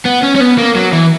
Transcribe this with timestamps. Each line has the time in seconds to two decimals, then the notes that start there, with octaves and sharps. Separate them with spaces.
0.06 B3
0.23 C#4
0.36 C#4
0.41 B3
0.58 A#3
0.76 F#3
0.93 E3